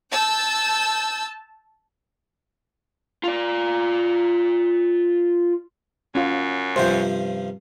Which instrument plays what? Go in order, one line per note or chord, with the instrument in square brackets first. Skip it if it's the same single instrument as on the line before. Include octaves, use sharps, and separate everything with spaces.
[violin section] A5 E6 G6
[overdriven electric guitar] F4 D5
[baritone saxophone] F#2 [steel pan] C#4 F4
[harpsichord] G2 C3 F3 [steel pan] C5